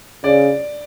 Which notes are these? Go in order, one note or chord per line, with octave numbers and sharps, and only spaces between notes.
C#3 D5